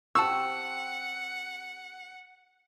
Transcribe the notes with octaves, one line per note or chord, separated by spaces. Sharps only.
C4 G4 C5 F#5 A5 C#6 E6